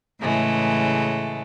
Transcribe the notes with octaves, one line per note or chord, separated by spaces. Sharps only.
A2 C#3 E3 G#3 A3